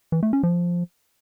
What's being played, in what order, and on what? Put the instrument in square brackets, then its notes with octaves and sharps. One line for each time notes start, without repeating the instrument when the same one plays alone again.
[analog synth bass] E3
A3
C#4
F3